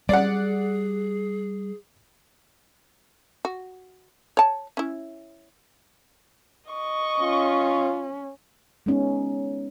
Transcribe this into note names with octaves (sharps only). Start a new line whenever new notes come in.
G3 G#4 D5 F#5
F#4
C#5 A5
C#4 E4
D#5 C#6
C#4 F4
G#3 B3 C#4 D#4